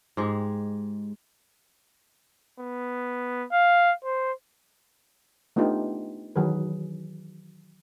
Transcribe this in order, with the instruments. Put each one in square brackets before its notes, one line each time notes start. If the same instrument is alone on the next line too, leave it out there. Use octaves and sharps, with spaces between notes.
[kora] G#2 G#3 G4 G#4
[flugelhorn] B3
F5
C5
[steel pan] A3 B3 D4 D#4 F4 G4
D#3 E3 F#3 G#4 B4